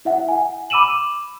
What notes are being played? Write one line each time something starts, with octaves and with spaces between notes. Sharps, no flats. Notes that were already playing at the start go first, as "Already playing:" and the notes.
E4 E5 F#5
F#5 G#5
B5 D6 E6 D#7 E7 F#7